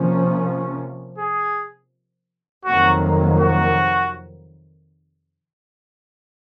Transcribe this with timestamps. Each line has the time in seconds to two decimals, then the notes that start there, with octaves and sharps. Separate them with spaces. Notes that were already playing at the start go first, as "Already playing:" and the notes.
Already playing: C3 F3 A#3 C#4
1.18 G#4
2.65 F2 C3 D#3 F#3 A#3 F#4
3.40 F#4